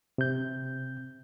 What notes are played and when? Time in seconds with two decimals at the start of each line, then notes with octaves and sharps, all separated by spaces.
0.18 C3 G6